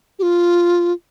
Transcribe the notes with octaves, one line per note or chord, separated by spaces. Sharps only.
G4
F4